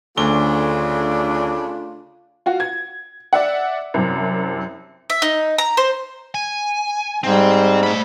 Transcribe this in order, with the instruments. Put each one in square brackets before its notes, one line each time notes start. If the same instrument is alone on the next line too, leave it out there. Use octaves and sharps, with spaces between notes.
[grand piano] D2 G7 [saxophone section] C#3 A3 D4 [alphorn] F4
[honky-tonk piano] F4 F#4
G#6
D5 E5 F#5
C2 F#2 C3
[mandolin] E5
D#4
A#5
C5
[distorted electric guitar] G#5
[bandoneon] G#2 [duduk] G3 [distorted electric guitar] C4
[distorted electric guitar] A3 B5